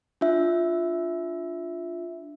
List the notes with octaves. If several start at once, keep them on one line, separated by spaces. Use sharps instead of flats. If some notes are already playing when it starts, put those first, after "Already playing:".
D4 F4 E5